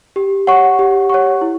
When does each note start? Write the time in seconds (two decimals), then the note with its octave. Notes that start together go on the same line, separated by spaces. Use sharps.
0.16 G4
0.47 C#5 F#5 C#6
0.79 G4
1.10 C#5 F#5 C#6
1.41 E4